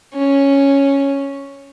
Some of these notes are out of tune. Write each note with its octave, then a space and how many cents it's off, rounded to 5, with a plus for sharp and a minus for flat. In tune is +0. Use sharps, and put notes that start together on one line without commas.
C#4 +0